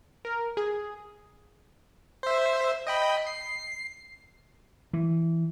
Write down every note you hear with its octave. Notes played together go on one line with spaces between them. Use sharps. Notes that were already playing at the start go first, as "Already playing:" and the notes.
A#4
G#4
C5 E5
D#5 G5 B5
C7
E3